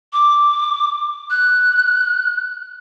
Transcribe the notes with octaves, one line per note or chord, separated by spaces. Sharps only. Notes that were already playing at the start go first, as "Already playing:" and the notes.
D6
F#6